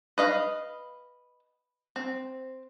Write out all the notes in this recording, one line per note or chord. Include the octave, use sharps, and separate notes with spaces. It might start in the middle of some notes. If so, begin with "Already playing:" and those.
B4 D#5 F5
C4